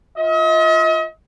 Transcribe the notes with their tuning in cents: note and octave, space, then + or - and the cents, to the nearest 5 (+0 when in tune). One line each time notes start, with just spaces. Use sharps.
F4 +0 D#5 +45